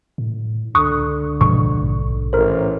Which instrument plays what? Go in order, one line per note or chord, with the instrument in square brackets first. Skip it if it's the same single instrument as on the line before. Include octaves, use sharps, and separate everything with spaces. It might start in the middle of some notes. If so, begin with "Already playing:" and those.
[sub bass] A2
[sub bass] C#2 [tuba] D3 [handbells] C#6 D#6 F#6
[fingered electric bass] G#2 B2 F3 [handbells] C#6
[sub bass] A#1
[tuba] A1 [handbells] A#4 C5